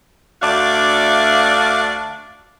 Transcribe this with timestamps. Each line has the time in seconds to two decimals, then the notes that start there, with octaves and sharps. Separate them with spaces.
0.42 D2 D4 F#4 D5 E5 F5